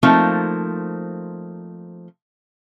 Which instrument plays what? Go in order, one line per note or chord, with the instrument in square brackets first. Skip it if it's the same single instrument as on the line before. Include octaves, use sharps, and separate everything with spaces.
[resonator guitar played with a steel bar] F3 A3 A#3 C4 D#4